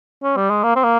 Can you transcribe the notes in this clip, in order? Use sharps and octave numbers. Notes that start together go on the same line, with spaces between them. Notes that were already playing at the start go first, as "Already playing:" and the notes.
C#4
G3
G#3
A#3
C4
A#3